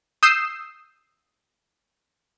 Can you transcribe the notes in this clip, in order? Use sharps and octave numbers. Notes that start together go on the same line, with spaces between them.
D#6 E6 G6 C7 E7